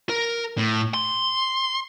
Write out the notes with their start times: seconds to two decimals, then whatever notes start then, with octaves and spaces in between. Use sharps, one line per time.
0.09 A#4
0.58 A2
0.94 C6